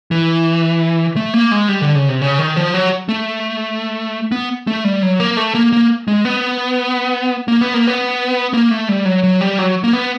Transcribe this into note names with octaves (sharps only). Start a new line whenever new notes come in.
E3
A3
A#3
G#3
G3
D3
C#3
C3
C#3
D#3
F3
F#3
A3
B3
A3
G3
F#3
A#3
A3
A#3
A#3
G#3
B3
A#3
B3
A#3
B3
A#3
A3
G3
F#3
F#3
G3
F#3
A#3
B3